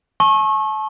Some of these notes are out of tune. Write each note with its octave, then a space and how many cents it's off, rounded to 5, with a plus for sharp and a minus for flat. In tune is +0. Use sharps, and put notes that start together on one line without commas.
A5 -35 C#6 -30 E6 -25